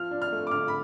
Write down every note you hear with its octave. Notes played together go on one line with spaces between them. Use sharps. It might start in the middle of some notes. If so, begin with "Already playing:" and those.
Already playing: F3 F6
D4
F6
A3
D6
D3 F6
B5